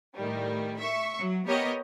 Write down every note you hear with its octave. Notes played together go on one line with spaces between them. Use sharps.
A2 D#3 G3
E5 C#6
F#3
B3 G4 A#4 C#5 D#5